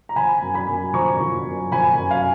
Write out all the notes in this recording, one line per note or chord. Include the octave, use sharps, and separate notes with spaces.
A#5
F3 G#5 B5
F#2
G#5 B5
F#2
F3 A#5 C#6
F3
F#2
F3 G#5 B5
F#2
F5 G#5